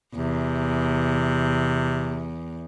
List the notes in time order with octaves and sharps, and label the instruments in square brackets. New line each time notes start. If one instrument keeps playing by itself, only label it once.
[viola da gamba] E2 [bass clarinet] C3